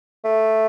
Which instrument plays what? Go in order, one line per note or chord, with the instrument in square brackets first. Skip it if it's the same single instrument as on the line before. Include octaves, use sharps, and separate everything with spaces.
[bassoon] A3